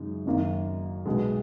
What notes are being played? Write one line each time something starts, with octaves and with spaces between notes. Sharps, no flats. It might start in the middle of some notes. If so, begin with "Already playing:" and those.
Already playing: F#2 C#3 G#3 D#4
F#1 F#2 D#3 A#3
B1 B2 G#3